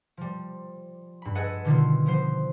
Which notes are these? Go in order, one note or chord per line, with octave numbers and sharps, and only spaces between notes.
F3 G3
G2 B5
G#4 A4 B4 D#5 F#5 E6
B2 D3 D#3 G3 B3 F4
F3 B3 C5